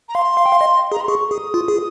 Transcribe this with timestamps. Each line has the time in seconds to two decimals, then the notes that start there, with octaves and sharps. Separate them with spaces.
0.09 A#5
0.14 F5 C6
0.37 F5
0.46 G5
0.52 F5
0.61 D#5
0.92 G#4 A#5
1.00 C6
1.08 G#4 C#6
1.31 G#4 D#6
1.54 F4
1.68 G#4